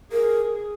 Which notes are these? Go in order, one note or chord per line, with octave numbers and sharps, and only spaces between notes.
G#4 A#4